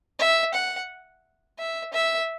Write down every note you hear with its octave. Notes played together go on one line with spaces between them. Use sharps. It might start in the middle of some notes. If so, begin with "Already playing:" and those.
E5
F#5
E5
E5